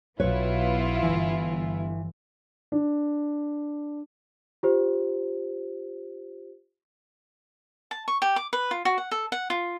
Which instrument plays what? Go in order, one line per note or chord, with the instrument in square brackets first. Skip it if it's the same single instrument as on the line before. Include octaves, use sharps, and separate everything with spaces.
[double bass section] B1 [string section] B3 E4 F4 [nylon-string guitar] B4 C#5
[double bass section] G1 [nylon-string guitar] E3
[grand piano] D4
[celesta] F4 G4 C5
[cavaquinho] A5
C#6
G4
D6
B4
F4
F#4
F#5
A4
F#5
F4